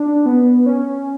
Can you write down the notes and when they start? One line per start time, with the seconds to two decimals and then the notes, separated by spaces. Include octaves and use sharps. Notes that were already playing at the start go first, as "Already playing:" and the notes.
Already playing: D4
0.26 B3
0.66 C#4